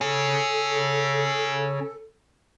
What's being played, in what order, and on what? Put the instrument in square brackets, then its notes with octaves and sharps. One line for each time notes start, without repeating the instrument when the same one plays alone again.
[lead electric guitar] C#4 G#4 [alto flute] A4